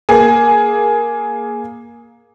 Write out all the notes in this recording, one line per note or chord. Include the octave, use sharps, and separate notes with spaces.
A#3 G#4